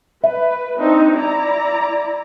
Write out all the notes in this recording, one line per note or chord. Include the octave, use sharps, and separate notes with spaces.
B4 E5
C4 D4 D#4
E4 D5 A#5